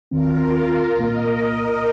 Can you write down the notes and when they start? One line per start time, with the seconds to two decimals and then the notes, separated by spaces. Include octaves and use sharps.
0.11 D#2 D#3 C4 F4 A#4
0.97 C2 A#2 A#3 A#4 D#5